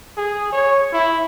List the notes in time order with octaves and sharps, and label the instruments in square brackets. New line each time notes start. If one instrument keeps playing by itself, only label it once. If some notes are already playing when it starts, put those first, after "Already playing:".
[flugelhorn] G#4
C#5
E4